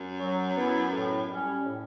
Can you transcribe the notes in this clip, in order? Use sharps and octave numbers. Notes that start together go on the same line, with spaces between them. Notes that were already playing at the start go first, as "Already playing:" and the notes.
Already playing: F#2
F#3
B3 E4
A2
G3 C#4
A2